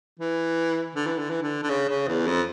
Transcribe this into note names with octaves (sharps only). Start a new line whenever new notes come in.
E3
D3
E3
D3
E3
D3
D3
C#3
C#3
E2
F2